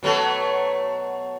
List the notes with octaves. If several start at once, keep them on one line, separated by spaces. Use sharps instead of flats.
B2 F#3 A3